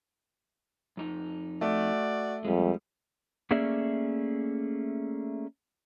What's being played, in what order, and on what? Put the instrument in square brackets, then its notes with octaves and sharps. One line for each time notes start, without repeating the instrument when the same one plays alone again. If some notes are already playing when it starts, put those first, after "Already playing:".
[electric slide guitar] F2 D#4
[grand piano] A3 [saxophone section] F#4 D5
[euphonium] F2 [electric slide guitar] G3 G#3
[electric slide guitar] A3 A#3 C#4 G#4 D5 E5